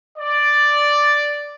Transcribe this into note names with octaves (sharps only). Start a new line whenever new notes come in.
D5